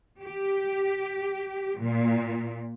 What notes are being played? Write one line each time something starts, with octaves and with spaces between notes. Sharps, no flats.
G4
A#2